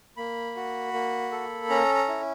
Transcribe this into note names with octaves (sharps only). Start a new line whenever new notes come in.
A#3 B5
F#4
A#3
A4
C#4 A#5
A#5
E4